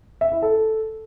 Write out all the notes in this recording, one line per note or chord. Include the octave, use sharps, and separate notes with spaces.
E5
E4
A4